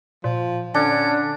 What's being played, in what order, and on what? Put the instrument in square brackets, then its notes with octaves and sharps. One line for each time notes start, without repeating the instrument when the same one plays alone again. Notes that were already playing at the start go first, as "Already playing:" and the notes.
[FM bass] A#2 [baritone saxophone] F3
[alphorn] D3 [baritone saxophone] C#4 [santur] D4